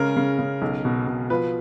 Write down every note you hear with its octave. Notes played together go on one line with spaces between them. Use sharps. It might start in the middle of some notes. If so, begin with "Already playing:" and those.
Already playing: C#3 G#3 A#4
C#3
C#3
B1
B2
B2
F3 B4